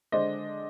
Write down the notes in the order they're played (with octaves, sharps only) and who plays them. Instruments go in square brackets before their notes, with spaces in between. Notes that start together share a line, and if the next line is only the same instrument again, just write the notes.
[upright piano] D3 G#3 D4 C5 D#5